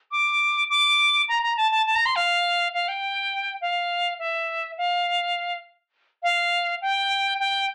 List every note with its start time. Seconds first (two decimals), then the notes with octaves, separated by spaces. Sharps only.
0.11 D6
0.70 D6
1.28 A#5
1.43 A#5
1.57 A5
1.71 A5
1.86 A5
1.95 A#5
2.06 C6
2.16 F5
2.74 F5
2.88 G5
3.61 F5
4.19 E5
4.78 F5
6.23 F5
6.81 G5
7.40 G5